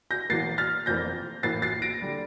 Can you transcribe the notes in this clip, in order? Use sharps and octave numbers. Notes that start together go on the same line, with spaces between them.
G6 A#6
E1 E2 E3 A#3 A6 C7
F6 A6
F1 F2 E3 A#3 G6 A#6
A#1 A2 E3 A#3 E4 A6 C7
A6 C7
A#6 D7
D3 G3 D4